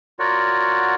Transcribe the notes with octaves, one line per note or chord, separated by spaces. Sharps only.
F4 F#4 A#4 C#5 D5 F#5